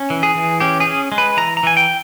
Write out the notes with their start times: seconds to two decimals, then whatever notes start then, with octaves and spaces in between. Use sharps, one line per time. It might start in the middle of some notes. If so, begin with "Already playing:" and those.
Already playing: C#4
0.10 E3
0.23 G#4
0.35 E3
0.60 C#4 G4
0.80 G#4
0.87 C#4
1.12 G#3
1.18 B4
1.37 E3 A#5
1.57 A#5
1.63 E3 G#5
1.77 G5